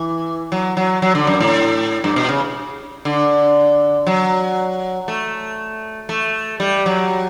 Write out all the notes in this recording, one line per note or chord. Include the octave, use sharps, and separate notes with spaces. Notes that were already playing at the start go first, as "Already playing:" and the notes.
Already playing: E3
F#3
F#3
F#3
D3
F#2
A2
G2
B2
C#3
D3
F#3
A3
A3
G3
F#3